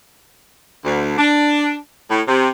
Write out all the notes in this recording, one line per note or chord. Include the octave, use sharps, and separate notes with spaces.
D2
D4
A2
C3